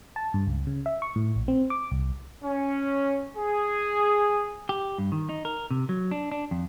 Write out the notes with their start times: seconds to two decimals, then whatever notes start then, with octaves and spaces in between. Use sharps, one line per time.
0.16 A5
0.34 G2
0.47 C#2
0.67 C#3
0.86 E5
1.02 C#6
1.16 A2
1.36 A#1
1.48 C4
1.70 D6
1.91 C2
2.44 C#4
3.37 G#4
4.69 G4
4.98 G2
5.12 D#3
5.29 D#4
5.45 A#4
5.71 C3
5.89 F#3
6.11 D4
6.32 D4
6.51 F2